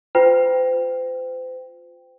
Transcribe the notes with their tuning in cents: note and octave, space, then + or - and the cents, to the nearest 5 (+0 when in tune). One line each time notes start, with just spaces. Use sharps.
F4 +10 C5 -40 G5 +0